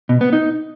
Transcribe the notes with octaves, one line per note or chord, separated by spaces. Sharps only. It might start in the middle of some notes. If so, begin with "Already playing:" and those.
B2
B3
D#4